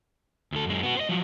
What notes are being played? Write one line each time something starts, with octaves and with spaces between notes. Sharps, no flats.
D2 A4
F#2 G#3
B3 F#4
C5 D#5
F3 F#3